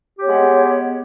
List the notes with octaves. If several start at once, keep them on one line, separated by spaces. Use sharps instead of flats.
G#3 B3 G4 C#5